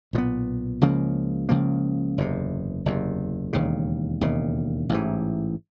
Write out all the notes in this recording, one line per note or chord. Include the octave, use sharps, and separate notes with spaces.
B1 A#2 G3 B3
C#2 C#3 F3 A#3
C#2 C#3 F3 A#3
F#1 E2 C3
F#1 E2 C3
E1 D#2 C#3
E1 D#2 C#3
A1 G#2 E3